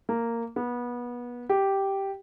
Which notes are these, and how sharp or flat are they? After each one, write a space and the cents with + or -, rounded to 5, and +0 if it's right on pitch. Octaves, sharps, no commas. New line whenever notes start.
A#3 -10
B3 -25
G4 -5